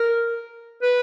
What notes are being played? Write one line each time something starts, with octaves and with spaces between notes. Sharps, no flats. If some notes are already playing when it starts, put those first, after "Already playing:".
Already playing: A#4
B4